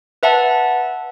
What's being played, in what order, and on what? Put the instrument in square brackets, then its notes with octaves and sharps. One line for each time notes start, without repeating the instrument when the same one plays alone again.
[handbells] B4 E5 F#5 A5